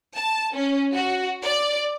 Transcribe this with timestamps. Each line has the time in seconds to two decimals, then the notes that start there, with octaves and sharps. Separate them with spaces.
0.17 A5
0.56 C#4
0.94 F#4
1.44 D5